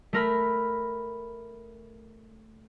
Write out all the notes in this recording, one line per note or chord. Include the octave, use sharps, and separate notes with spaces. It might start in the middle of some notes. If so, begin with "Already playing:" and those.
A3 A#4 B5